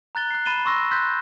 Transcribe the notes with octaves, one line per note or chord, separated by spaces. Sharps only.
A#5 F#6 A6 G7
F#6 C7
B5 A6 D#7 E7 G7
C6 C#6 E6 A#6
C6 F#6 G6 A6 B6